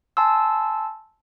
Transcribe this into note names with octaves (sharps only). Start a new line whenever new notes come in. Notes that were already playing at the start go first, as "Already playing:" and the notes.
G#5 A5 C6 E6